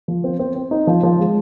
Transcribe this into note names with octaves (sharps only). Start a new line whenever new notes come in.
F3
C4
C4
C4
D#4
F3
F3
G#3